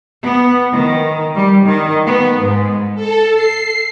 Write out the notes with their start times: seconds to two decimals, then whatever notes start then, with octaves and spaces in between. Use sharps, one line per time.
0.24 B3
0.73 D#3
1.34 G3
1.63 D#3
2.06 B3
2.41 G#2
2.95 A4
3.35 C7